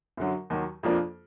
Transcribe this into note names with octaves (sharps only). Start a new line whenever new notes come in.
F#2 D3 F#3
D#2 D#3 F#3
F2 F3 A#3 D4 F4